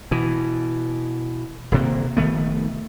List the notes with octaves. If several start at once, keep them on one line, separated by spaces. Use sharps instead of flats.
B2 E3
D#1 C3 A#3
F1 D#3 A3 B3